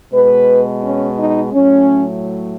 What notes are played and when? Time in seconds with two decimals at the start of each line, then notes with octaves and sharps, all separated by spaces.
0.12 B2 G#3 B4
0.83 C#4
1.18 D#4
1.54 A2 F#3 A3 C#4